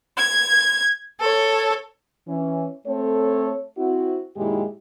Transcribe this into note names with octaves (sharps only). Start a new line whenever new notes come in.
G#6
A4 C#5
E3 C#4
A3 C4 A4 C#5
C4 E4 F#4
F#2 A#2 D#3 G#3 E4 G4